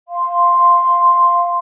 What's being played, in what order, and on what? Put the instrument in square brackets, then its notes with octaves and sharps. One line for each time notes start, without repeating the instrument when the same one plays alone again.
[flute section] F5 C6